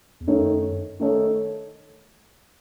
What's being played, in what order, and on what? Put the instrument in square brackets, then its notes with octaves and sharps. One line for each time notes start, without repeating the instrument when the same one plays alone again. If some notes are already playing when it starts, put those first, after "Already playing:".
[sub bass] E2
[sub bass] F#2 [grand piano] D#3 A3 D#4 A4 C#5
[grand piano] D#3 A3 D#4 A4 C#5